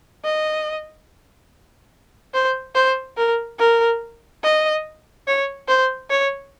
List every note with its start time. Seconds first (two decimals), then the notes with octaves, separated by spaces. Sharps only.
0.24 D#5
2.34 C5
2.75 C5
3.17 A#4
3.59 A#4
4.44 D#5
5.27 C#5
5.68 C5
6.10 C#5